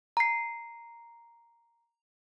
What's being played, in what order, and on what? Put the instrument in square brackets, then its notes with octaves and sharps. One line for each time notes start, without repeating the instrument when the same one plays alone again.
[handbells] A#5 C7